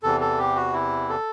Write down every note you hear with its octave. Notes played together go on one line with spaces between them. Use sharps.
E2 C3 E3 A4
A4
G4
F#4
E4
A4